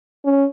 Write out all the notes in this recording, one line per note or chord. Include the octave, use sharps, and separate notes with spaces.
C#4